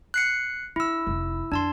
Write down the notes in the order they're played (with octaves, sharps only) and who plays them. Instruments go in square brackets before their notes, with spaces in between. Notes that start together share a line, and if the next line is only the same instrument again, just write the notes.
[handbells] F#6 C7 C#7
[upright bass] D4 [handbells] E4 E6
[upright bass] F1
[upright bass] F2 [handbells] D4 A5 C6